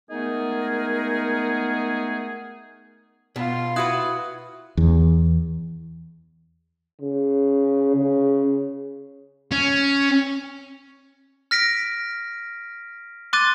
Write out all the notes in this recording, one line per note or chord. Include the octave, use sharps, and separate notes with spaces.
G#3 A3 B3 D#4 G#4 A#4
B2 F4
E4 F#4 B4 D#6 F#6 G#6
E2
C#3
C#3
C#4
F6 A#6 B6 D7
C6 D6 F#6 A6 D#7